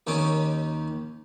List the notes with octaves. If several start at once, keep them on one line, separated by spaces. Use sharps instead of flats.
D#2 D#3 C#4 D6